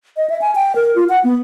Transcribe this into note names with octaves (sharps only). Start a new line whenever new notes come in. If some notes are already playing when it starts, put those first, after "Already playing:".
D#5
E5
G#5
G5
A#4
F4
F#5
B3